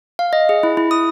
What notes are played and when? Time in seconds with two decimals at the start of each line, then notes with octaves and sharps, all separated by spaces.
0.19 F5
0.33 D#5
0.49 G#4
0.63 E4
0.77 E4
0.91 D#6